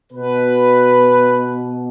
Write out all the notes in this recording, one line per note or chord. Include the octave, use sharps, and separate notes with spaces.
B2 B4